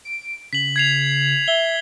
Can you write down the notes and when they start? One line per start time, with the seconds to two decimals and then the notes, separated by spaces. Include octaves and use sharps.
0.05 D7
0.53 C#3 B6 F#7
0.76 G#6 C7 F7
1.48 E5 G7